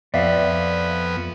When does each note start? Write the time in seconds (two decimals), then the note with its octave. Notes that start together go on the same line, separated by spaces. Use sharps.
0.14 F2 B3 D5 E5 F5